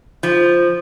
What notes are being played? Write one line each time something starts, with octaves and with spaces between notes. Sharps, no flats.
F3